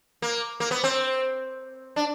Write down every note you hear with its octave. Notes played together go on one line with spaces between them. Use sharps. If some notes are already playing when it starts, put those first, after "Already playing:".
A#3
A#3
B3
C4
D4